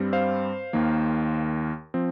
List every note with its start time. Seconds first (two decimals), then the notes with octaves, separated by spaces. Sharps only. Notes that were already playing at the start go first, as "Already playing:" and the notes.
Already playing: G2 G3 C4
0.13 C5 F5
0.73 D#2 D#3 A#3
1.94 F3 C4